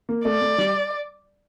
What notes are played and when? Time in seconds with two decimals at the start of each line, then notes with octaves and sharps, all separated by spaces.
0.09 A#3
0.25 A3 D5
0.41 A3
0.58 G3